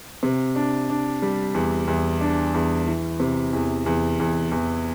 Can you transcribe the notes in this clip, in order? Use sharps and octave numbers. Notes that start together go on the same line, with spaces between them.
C3
D4
D4
G3
E2
E2
D4
E2
E3
C3
E2
E2
E2
E2